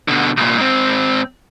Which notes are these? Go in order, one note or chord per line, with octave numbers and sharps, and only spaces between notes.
B2 D3
C2 A#2
G#2 C4